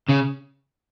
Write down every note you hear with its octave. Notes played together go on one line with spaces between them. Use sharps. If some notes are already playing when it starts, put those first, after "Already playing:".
C#3